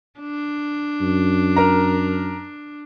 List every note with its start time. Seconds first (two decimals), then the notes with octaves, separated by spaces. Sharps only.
0.20 D4
1.01 F#2
1.56 A#4 A#5